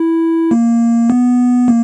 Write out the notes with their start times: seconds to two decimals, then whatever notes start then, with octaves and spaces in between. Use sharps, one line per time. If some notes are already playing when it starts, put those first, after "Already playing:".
Already playing: E4
0.51 A#3
1.10 B3
1.68 A#3